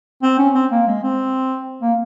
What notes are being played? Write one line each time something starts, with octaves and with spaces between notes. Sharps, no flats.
C4
C#4
C4
A#3
G#3
C4
A#3